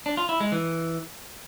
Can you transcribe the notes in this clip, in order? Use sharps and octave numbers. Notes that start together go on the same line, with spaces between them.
D4
F4
E4
G#3
E3